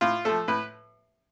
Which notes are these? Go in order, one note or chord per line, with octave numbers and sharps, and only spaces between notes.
A2 F4
F3 A3 A4
A2 B4